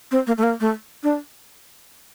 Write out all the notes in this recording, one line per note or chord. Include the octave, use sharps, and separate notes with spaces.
C4
A#3
A3
A#3
A3
D4